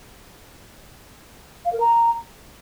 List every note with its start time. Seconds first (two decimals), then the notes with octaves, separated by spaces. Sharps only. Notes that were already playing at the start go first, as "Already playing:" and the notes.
1.65 F5
1.73 A#4
1.80 A#5